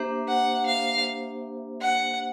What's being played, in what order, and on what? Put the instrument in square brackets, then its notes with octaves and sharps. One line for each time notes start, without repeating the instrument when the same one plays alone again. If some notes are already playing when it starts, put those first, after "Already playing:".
Already playing: [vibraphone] A#3 D4 G4 C5 E5
[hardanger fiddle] F#5
F5
F#5